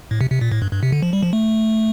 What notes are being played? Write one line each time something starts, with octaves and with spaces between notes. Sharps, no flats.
A2
C3
C3
A#2
A2
G2
G2
C3
D3
F3
G3
F3
A3